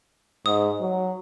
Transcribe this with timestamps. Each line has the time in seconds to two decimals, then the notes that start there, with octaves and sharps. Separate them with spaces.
0.46 G#2 D#6
0.80 F#3